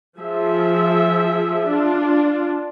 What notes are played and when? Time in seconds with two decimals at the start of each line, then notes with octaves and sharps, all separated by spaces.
0.19 F3 G#4 E5
1.69 D4 F4